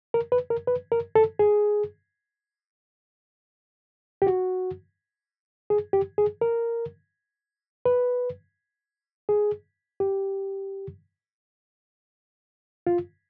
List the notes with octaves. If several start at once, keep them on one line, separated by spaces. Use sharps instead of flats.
A#4
B4
A#4
B4
A#4
A4
G#4
G4
F#4
G#4
G4
G#4
A#4
B4
G#4
G4
F4